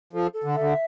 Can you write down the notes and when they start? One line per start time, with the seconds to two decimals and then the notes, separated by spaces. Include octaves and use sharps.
0.13 F3 A4
0.33 A4
0.44 D3
0.54 E5
0.60 D3